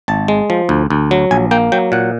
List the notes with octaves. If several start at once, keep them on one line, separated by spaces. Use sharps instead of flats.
G#1 A5
G#3
F3
D2
D2
F#3
A#1 G#5
A#3 G5
F#3 G5
A#2 F#5